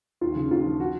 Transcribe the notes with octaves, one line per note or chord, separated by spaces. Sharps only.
D#2 F4
C#3
D#2 F4
F3
F#4